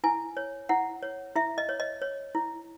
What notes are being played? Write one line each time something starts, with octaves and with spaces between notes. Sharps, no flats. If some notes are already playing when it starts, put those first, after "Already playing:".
E4 G#5
C#5
E4 F#5
C#5
E4 E5
D#5
C#5
D#5
C#5
E4